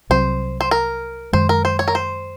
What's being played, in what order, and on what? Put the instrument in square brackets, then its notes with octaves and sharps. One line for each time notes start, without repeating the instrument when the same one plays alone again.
[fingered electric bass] C2 C3 F#3 C4 [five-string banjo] C5
[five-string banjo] C5
A#4
[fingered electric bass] F#2 D#3 G#3 [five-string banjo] C5
[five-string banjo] A#4
C5
C#5
A#4
C5